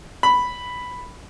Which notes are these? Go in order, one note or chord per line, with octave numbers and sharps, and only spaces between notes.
B5